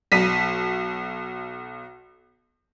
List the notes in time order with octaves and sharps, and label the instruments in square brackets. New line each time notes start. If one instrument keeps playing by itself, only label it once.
[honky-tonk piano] B1 B6 D#7